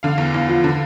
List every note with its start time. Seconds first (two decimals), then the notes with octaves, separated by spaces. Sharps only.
0.03 D3 F5
0.18 E2
0.34 E2
0.49 F3
0.64 D3